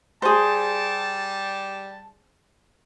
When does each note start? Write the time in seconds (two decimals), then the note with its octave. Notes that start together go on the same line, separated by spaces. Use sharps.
0.22 G3 G#4 C5 A5